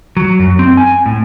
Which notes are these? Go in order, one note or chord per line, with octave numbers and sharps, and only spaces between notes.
F#3
F#2
C4
G#5
A2